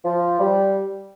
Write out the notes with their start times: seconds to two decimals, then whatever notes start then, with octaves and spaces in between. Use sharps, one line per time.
0.04 F3
0.39 G3